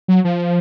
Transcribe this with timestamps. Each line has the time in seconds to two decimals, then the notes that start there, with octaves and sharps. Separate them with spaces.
0.08 F#3
0.25 F3